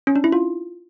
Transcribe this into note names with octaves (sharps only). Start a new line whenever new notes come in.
C#4
D4
E4
F4